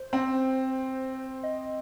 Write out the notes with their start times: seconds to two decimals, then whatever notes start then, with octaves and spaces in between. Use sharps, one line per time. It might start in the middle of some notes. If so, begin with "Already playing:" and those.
Already playing: C5
0.13 C4
1.43 D#5